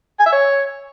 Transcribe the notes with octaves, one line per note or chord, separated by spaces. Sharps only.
G#5
E5
C#5